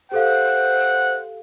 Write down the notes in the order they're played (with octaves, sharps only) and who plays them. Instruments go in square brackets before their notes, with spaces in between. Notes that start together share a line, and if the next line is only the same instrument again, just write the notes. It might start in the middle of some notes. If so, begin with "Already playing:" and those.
[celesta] G4 A4 F5 [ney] C5 [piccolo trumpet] F#5